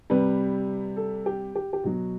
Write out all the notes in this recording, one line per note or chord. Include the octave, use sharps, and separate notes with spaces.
C3 G3 B4
A4
G4
G4
G4
B2 F#3 F#4